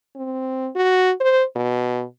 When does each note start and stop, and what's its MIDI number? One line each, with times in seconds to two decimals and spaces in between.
0.16 0.70 60
0.76 1.12 66
1.20 1.44 72
1.56 2.03 47